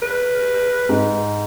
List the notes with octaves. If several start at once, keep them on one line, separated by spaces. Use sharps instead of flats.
B4
G#2